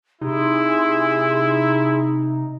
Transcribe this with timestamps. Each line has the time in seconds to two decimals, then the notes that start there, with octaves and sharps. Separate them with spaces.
0.21 C3 D#4 E4 G#4 C6